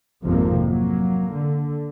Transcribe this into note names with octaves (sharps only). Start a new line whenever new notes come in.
G#1 F2 C3 F3 A#3
F#3 A#3
D3